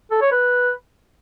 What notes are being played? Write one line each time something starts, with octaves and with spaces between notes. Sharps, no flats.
A4
C#5
B4